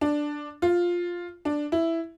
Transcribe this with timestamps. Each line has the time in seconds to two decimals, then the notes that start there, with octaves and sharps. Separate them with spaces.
0.01 D4
0.62 F4
1.45 D4
1.72 E4